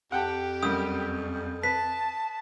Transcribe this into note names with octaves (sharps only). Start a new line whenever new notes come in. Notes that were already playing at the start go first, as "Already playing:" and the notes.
F2 G4 F#5 G5 A5
F#2 G3 D#6
B4 A5 B6